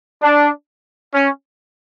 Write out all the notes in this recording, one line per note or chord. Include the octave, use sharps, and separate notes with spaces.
D4
C#4